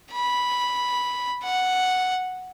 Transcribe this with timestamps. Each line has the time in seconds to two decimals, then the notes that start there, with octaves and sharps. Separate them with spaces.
0.12 B5
1.44 F#5